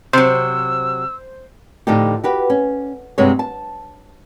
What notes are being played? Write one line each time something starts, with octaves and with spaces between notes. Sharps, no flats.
C3 F#3 C5 E6
A2 D3 F3 D4 D#4 G4
F#4 G4 B4
C#4
G2 C3 G#3 B3 C#5
A5